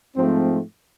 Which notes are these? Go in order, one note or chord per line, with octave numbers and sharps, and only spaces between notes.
G#2 F3 A3 C4